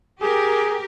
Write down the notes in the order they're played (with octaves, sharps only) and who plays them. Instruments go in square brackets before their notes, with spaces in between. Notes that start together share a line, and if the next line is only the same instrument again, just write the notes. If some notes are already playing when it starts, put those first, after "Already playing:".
[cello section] G4 A#4 [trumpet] G#4